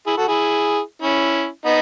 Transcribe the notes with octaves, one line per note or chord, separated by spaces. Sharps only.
E4 G#4
F#4 A4
E4 G#4
C#4 E4
B3 D#4